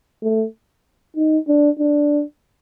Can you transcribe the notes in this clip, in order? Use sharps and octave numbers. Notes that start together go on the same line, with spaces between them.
A3
D#4
D4
D4